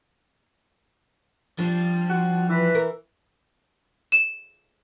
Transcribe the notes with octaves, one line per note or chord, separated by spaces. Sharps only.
F3 G3 D4
F#4
E3 B4
A#4
E7